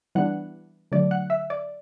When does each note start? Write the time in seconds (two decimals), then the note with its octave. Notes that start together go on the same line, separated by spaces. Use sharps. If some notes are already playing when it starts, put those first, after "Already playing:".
0.15 E3 G3 B3 D4 F#5
0.92 D3 F#3 A3 D5
1.11 F#5
1.30 E5
1.50 D5